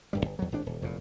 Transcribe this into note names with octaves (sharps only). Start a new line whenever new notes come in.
D1 G2 G3
G1
E2 F#3
G#1 A2 D4
D#1
F1 E2 A#2